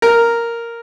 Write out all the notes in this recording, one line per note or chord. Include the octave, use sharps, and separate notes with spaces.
A#4